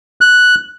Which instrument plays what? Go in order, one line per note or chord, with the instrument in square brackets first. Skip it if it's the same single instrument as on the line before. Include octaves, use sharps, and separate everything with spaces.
[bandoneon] F#6